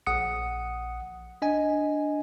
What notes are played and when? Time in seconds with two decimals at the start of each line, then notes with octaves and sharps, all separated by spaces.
0.06 A#1 F#5 D#6 C#7
1.42 D4 D#5 G#5